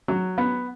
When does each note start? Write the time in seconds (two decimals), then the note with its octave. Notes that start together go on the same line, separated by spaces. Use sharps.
0.08 F#3
0.38 B3